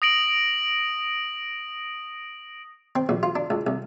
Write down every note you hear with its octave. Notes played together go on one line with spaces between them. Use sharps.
D#6 A#6 D7 F#7
C4
A#1
F4
D4
C#2
C2